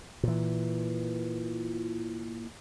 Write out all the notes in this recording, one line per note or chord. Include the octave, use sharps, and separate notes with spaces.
A#2 E3